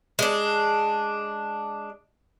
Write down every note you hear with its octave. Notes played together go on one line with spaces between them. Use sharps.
G#3 D4